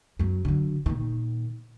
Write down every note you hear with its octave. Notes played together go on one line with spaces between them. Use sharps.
F#2 F#3
D3 F#3
A#2 D#3